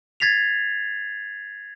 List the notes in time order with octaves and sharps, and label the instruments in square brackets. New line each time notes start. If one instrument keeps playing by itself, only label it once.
[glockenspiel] G#6 A6 B6 C7 F7